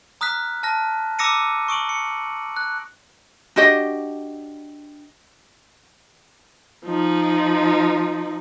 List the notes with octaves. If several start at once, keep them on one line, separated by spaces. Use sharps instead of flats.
A#5 D#6 F6 F#6 B6
A5 F6 A#6
A#5 D6 E6 A#6 C#7 D#7
C#6 D#6 D7 F#7
C#7
F#6
D4 F#4 G4 D#5
F3 D#4